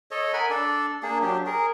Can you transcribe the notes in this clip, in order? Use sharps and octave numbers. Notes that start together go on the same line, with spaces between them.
A4 C#5 D#5
A#4 F#5 G#5 B5
D4 A4 D5
A#3 D4 G#4
F#3 D4 G4
G#4 A#4